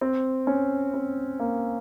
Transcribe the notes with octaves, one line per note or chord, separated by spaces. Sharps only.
C4
C#4
C4
A#3